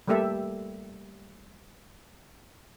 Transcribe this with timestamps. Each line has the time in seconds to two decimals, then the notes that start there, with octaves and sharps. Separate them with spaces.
0.08 G3 A3 A#3 G4 A4 E5